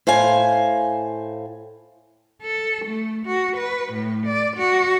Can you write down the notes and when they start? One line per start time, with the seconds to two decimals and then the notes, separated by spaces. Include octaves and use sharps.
0.07 A2 C5 F5 G#5
2.42 A4
2.85 A3
3.26 F#4
3.57 B4
3.93 A2
4.26 D5
4.57 F#4